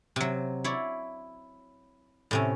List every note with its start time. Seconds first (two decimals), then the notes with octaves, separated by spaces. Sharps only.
0.16 C3 F#3
0.64 E4 C#5 D5
2.31 A2 C3 C#4